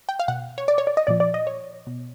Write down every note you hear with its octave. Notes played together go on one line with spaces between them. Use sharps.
G5
F5
B2 F#5
C#5
D5
C#5
D5
D#5
A#2 F3 D5
D5
D#5
C#5
B2